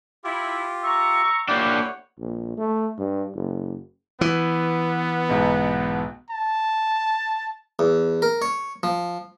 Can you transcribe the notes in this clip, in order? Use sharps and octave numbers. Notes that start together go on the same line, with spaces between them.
E4 F4 G4
E5 A#5 C#6
A#3 D4 E4 G4 C#5 F#5
A#1
A3
G2
F#1
E3 B3
B1 G#2 B2
A5
E2
A#4
C#5
F3